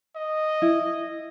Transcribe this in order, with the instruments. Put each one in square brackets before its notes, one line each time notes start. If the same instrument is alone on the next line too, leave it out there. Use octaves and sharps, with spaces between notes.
[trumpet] D#5
[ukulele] E4